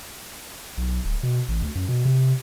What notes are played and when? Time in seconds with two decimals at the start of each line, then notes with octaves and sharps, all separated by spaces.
0.77 B1
1.05 D1
1.23 B2
1.48 A1
1.62 D2
1.75 F#2
1.88 B2
2.05 C3